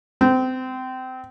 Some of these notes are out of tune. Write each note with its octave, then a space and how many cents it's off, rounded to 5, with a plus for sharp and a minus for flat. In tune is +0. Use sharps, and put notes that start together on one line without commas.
C4 -25